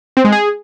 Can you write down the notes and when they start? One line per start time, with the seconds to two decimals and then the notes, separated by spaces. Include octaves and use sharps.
0.17 C4
0.25 G#3
0.32 G#4